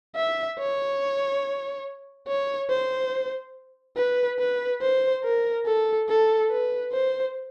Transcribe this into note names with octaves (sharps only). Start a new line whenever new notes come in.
E5
C#5
C#5
C5
B4
B4
C5
A#4
A4
A4
B4
C5